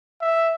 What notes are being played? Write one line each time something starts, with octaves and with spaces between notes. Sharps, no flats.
E5